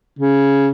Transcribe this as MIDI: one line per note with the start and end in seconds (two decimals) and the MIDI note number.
0.19 0.69 49